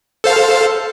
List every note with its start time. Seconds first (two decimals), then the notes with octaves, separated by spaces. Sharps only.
0.24 A4 C5 F5